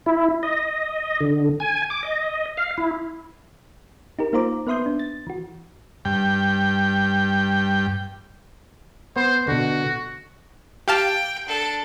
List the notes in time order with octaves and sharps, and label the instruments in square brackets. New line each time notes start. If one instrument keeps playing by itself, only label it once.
[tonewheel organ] E4
D#5
D3
G#5
D6
D#5
F5
E4
[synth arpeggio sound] D#4 G4 A#4
A#3 D#4 F4 C5 A#5 D6
B3 B4 E5 C6 D#6 G6
D4
A6
E3 F#4
[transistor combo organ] G2 G5
[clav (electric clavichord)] B3 [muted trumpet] C5
[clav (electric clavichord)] B2 D3 [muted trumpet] F#4
[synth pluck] G4 F5 A5 [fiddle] G5
[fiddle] D4 A4